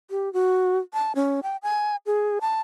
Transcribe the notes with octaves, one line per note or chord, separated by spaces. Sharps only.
G4
F#4
A5
C#4
G5
G#5
G#4
A5